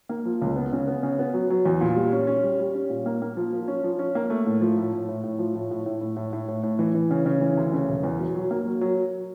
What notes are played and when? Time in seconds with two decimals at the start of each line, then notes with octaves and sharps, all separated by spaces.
0.09 A#3
0.25 F3
0.42 C#2
0.56 B3
0.72 C#3
0.88 B3
1.03 C#3
1.19 B3
1.34 F#3
1.50 F#3
1.65 E2
1.81 A#2
1.96 G3
2.12 C#4
2.27 C#4
2.43 G3
2.59 G3
2.74 C#4
2.90 A#2
3.06 A#3
3.22 A#3
3.37 F3
3.53 F3
3.68 C#4
3.84 F3
3.99 C#4
4.15 A#3
4.30 A3
4.46 A2
4.61 F3
4.78 A2
4.93 A2
5.09 A2
5.24 A2
5.39 F3
5.55 A2
5.71 A2
5.86 A2
6.01 A2
6.17 A2
6.33 A2
6.48 A2
6.63 A2
6.79 E3
6.95 E3
7.11 C#3
7.26 C#3
7.41 E3
7.57 D2
7.73 C#3
7.88 E1
8.03 E2
8.20 F#3
8.35 F#3
8.51 A#3
8.67 F#3
8.81 F#3